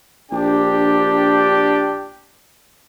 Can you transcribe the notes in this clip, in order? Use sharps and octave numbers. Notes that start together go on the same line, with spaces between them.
A#1 D4 G4 G5